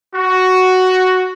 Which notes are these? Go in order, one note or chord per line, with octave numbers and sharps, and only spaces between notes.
F#4